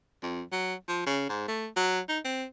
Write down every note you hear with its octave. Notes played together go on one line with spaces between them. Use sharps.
F2
F#3
F3
C#3
G#2
A3
F#3
D#4
C4